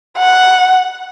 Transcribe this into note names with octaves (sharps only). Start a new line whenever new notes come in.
F#5